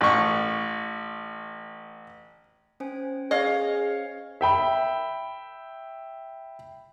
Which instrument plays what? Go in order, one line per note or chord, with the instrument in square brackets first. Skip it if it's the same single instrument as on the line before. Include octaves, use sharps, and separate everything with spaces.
[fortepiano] A1 C#6
[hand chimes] C#4 C5 G#5
[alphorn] G#4 [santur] C#5 F5 [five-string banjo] D#5
[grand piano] E5 G5 B5